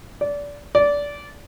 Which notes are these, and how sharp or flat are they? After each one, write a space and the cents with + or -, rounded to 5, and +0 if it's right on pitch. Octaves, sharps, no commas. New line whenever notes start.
D5 -25
D5 -20